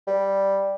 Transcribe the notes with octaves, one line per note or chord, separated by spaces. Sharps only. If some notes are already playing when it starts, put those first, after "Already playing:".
G3